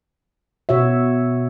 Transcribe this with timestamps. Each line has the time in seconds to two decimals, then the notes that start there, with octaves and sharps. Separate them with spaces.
0.69 B2 F#4 C#5 E5